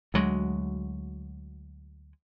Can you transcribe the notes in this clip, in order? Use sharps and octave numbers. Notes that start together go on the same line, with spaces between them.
D2 F#3 G#3